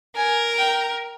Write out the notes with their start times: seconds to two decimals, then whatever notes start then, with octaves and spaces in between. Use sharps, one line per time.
0.16 A#4 G#5
0.58 G5